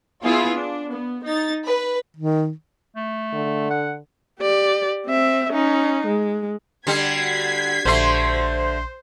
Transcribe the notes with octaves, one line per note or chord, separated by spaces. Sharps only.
B3 E4 F4 G#4
D4
B3
D#4 A6
B4
D#3
A3
D3
F#5
G4 D5
C4 E5
C#4 D#4
G#3
D3 G3 F#4 G#6 B6 C7
A#1 D3 A3 C5 C6